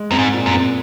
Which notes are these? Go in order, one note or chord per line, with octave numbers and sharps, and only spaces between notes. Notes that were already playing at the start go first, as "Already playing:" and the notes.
Already playing: G#3
F#2 C4
G#2
A#2
F#2
C4